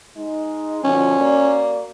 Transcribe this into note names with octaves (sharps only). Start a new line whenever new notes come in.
G#3 D#4
B2 D3 F3 C#4
A#3 F#4 D5